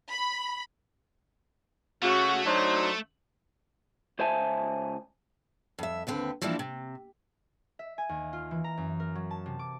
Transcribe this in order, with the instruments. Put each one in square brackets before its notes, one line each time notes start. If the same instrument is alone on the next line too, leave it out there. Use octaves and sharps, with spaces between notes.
[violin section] B5
[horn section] C#3 F#4 [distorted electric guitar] A3 [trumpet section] C#6
[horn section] F#3 [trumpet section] D4 D#4 C5
[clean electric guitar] C#2 C5 E5 G#5 A5
[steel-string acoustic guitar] F2 E5
D#2 D3 C4 B4
E3 F3 G3 A#3 D4 E4
C3
[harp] E5
G#5
D#2
F4
E3
A#5
F#2
A#4
F#3
A5
C3
D6